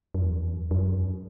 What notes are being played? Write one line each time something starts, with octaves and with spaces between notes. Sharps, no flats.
F#2
E2
F#2